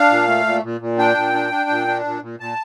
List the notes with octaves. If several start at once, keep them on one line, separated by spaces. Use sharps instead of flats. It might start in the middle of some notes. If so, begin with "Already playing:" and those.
Already playing: D4 F5
A#2
A3
A#2
A#2
A#2
D4 G5
A#2
D4
D4
A#2
D4
A#2
A#2
A#2 A5